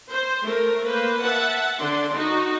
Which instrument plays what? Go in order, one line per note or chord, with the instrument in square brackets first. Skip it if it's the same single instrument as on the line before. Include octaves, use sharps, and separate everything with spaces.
[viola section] C5
A3 A#4
A#3 B4 C5
E5 F#5 A5
D3 D5 C6
D#4 F#4